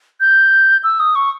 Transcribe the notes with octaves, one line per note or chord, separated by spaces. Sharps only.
G6
E6
D#6
C#6